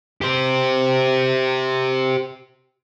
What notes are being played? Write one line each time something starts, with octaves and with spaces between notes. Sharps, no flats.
G4 C5